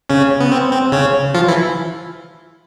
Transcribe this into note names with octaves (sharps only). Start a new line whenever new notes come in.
C#3 C#4
B3
C4
C4
C#3 C#4
F3 F4
E3 E4